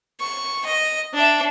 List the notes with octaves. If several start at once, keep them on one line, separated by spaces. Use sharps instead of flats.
C#6
D#5
D4 E5